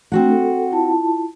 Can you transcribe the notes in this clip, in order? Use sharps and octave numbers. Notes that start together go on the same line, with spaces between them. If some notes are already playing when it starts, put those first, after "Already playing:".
A3 C4 D4 F#4 F#5
A4
E4 F4 A5